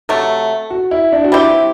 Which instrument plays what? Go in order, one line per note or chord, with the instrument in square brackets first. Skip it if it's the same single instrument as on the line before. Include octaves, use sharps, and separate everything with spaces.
[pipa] C3 F#3 A3 [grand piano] A4
[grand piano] F#4
E4
D4
F#4
[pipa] G3 C4 G4 [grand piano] E4